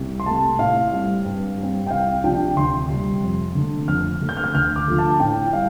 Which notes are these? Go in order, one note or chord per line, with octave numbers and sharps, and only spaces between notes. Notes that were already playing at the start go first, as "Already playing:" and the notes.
Already playing: C2
C6
C3 A3 A5
A2 F5
G3 C4
G2
G3 C4
G5
C2 F5
C3 F3 D4 G5
D2 C6
C3 G3 C4
F2
D3 A3
F2 F6
D3 A3
G6
F6
G6
D2 F6
D6
D3 F3 A3
A5
A2 G5
G3 F5